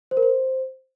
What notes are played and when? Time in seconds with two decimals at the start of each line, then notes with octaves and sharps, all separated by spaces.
0.11 C5
0.17 A#4
0.23 C5